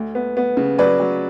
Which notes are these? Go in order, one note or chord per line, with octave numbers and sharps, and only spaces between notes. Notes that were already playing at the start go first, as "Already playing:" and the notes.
Already playing: D2
B3
B3
C#3
F#3 B4 D5
F#3